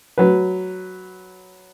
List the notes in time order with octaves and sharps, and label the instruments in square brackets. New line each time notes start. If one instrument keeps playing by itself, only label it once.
[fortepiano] F#3 B4